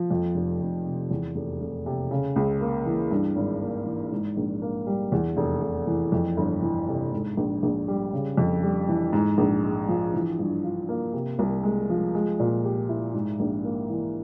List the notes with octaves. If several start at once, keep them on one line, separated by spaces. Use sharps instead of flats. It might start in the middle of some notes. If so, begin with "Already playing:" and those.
Already playing: F3
F2
F1
F1
C3
E2
F1
F1
C3
C#3
C#2
A#3
E3
G2
G#1
A#3
E3
G#2
A#1
A#3
G3
E2
F1
F1
E3
F2
G1
E3
C3
G#2
A#1
A#1
G3
C#3
F2
G3
E3
G#2
A#1
G#3
F3
E3
G2
F4
A#3
C3
C2
G#3
F3
G#3
A#2
G4
E4
G#2
A#1
A#3
E3